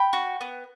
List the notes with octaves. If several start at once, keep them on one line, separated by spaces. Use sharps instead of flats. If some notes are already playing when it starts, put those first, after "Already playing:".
Already playing: G5 B5
F#4
B3